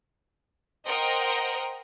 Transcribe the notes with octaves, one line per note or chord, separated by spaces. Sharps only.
A#4 C5 D#5 F#5 G5 A#5